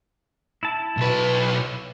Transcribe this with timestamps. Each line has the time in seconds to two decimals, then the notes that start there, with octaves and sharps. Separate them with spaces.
0.63 E4 A5
0.97 B1 B4